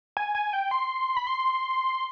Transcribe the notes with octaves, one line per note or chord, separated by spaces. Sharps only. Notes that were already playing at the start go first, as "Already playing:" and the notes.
G#5
G#5
G5
C6
B5
C6